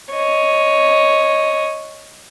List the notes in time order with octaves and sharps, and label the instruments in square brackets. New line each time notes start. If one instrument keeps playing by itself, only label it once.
[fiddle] C#5 D#5